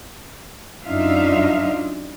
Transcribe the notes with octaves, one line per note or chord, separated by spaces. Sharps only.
F#2 D4 D#4 F4 E5 F5